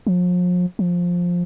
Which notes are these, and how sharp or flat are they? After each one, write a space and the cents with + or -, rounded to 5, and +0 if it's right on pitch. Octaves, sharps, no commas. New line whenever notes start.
F3 +40
F3 +10